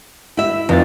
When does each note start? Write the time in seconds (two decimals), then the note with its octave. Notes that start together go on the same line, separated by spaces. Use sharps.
0.37 E4 E5
0.69 F1 F2 A6